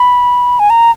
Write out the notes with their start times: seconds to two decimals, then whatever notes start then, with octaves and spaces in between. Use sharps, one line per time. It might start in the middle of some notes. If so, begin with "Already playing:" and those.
Already playing: B5
0.59 G#5
0.70 A#5